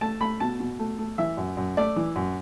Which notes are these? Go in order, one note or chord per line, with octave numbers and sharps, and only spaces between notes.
A3 A5
A3 B5
B2 A5
B2
A3
A3
E3 E5
F#2
F#2
A3 D5
E3
F#2